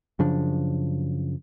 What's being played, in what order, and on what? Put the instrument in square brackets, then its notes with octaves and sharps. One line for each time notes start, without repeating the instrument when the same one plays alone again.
[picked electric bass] F#2 C#3 F3 D4